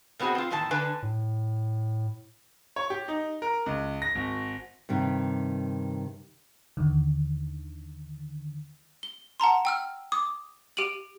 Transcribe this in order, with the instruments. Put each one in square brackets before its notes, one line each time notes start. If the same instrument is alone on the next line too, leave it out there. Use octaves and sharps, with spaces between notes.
[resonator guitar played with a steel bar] B2 B3 C4 F#4 G#4
C4 F4
E2 A2 D#3 A5
D3 D4 B4 G#5
[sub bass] A2
[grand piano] C#5
G4
D#4
A#4
C#2
A#6
G#1
[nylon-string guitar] G2 C3 D#3
[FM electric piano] D#2 D3 D#3
[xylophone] G7
F#5 A5 A#5 C6
G5 E6 F6
D6 D#6
G4 D7 D#7 F#7